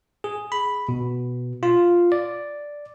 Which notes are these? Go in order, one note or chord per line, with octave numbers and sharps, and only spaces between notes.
G#4
B5
B2
F4
D5